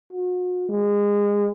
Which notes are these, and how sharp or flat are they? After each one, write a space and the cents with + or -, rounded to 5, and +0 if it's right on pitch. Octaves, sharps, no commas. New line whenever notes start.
F#4 -40
G#3 -25